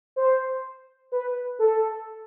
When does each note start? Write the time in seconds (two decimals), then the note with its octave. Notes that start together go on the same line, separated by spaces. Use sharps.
0.16 C5
1.12 B4
1.59 A4